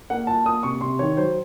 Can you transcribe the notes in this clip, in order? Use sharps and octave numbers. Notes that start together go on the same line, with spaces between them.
A#3 F#5
F4 A5
A#3 D#6
C3 C#6
C3 C6
D#3 C#5
F#3 C5